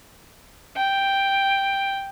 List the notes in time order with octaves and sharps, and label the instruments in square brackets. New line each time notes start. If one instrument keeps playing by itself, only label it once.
[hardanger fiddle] G5